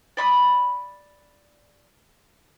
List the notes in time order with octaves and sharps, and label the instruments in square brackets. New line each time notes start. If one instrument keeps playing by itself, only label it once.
[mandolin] D5 B5 C#6 D#6